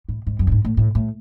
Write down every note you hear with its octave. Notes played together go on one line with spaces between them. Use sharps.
A2
G#2
F#2
G2
G#2
A2
A2
A2